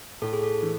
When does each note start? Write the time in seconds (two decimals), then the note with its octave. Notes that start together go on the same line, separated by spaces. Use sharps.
0.22 A2 A4
0.33 G#4
0.43 A4
0.63 E3